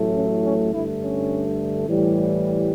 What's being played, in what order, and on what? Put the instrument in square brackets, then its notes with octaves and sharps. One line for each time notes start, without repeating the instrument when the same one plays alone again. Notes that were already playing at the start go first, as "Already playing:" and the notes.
Already playing: [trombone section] A1 A2 F#3 A3
C#4
C#4
G2 D3 A3 E4
C#4
A2 E3 G3